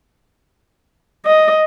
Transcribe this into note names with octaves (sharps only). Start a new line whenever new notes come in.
D#5